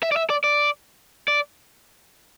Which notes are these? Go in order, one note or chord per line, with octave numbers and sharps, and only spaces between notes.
E5
D5
E5
D5
D5
D5